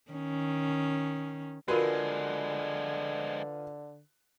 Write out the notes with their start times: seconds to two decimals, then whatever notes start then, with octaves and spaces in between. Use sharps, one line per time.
0.11 D#3 C#4
1.68 D3 F3 G#3 F4 F#4 A#4 B4